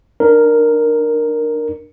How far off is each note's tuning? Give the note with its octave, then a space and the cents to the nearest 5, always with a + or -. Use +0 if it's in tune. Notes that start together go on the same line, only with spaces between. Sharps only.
D4 +30 A#4 +0